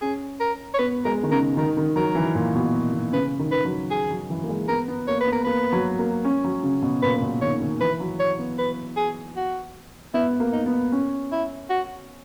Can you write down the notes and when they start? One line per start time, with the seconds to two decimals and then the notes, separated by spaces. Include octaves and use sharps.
0.01 C#4 G#4
0.40 A#4
0.74 C#5
0.79 B3 B4
1.05 G#3 A#4
1.23 D#3
1.31 C#3 A#4
1.57 D#3 A#4
1.77 D#3
1.96 F#3 A#4
2.15 E3
2.35 A#2
2.54 B2
2.75 A#2
2.93 B2
3.12 C#3 B4
3.39 D#3
3.52 B4
3.65 F#3
3.91 G#4
4.11 F#3
4.30 E3
4.43 A#3
4.49 G#3
4.68 B3 A#4
4.88 B3
5.07 A#3 C#5
5.21 B4
5.27 B3
5.32 A#4
5.44 A#3 B4
5.73 F#3
5.99 A#3
6.25 C#4
6.44 F#3
6.63 C#3
6.82 B2
7.03 A#2 B4
7.22 B2
7.42 D#3 C#5
7.60 D#3
7.80 E3 B4
8.00 F#3
8.20 C#5
8.39 B3
8.58 B4
8.97 G#4
9.36 F#4
10.14 B3 E4
10.40 A#3
10.53 D#4
10.66 B3
10.92 C#4
11.32 E4
11.70 F#4